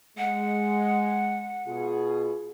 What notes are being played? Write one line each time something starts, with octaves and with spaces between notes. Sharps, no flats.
G#3 F#5
B2 F4 G#4